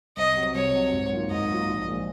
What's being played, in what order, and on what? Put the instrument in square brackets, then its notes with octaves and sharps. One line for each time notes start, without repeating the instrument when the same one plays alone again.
[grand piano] C2 [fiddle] D#5
[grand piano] C3 F#3
[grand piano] C2 [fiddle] C#5
[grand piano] C3 F#3
G#2
D#3 F#3 A#3 F4
[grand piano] G#2 [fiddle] D#5
[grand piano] D#3 F#3 A#3 F4
A#1
A#2 F3 G#3